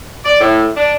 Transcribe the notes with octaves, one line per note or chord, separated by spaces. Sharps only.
D5
A2
D4